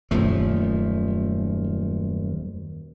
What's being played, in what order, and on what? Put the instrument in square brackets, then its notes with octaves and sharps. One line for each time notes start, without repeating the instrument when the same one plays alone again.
[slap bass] D#1 F#2 F3 A3